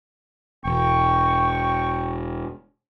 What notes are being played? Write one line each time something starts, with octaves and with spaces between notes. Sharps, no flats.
E1 G5 C#6